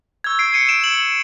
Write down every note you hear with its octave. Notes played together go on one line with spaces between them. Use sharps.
C#6 E6 G6 G#6
C7 D7
C#7 D#7
D7 E7
E7 F#7